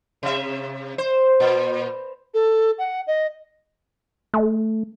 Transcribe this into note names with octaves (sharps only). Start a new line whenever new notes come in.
C3 E5
C5
A#2
A4
F#5
D#5
A3